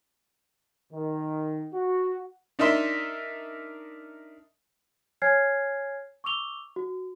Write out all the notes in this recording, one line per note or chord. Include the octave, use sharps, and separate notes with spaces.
D#3
F#4
D4 D#4 A#4 E5 C6
C#5 G#5 F6 G#6 C7
C#6 D6 E6 F7 G7
F#4